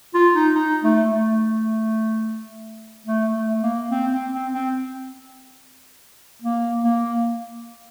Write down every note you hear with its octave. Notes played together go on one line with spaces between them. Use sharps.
F4
D#4
D#4
A3
A3
A3
A3
A#3
C4
C4
C4
C4
A#3
A#3